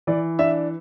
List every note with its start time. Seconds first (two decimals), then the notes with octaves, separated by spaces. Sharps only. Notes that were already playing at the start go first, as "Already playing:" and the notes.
0.07 E3 D5
0.39 D4 E5